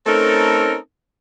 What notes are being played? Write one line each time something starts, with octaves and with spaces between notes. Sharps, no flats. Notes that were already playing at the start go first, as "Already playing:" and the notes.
A3 C4 C#4 D#4 A4 A#4